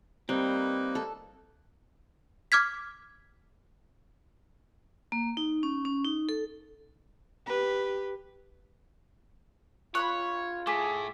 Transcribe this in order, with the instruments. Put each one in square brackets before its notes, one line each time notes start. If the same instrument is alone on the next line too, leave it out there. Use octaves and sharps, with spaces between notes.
[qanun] G3 [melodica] A#3 D#4 B4 [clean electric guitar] C4
[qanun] A4
[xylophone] D6 F6 G#6 B6
[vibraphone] A#3
D#4
C#4
C#4
D#4
A4
[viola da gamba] G4 B4
[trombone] F4 [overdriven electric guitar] C#5 [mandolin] B5 D#6 F#6 [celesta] C#6
[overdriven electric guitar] A2 A3 [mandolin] G#4 [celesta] D6 B6